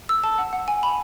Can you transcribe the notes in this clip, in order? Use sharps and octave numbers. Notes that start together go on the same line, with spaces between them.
E6
A5
F#5
F#5
G#5
B5